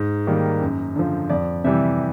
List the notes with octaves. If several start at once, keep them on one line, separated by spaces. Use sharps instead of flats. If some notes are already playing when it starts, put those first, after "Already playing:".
Already playing: G#2
D#3 G3 A#3
F#2
D3 F3
F2 D5
C3 E3 G3 E5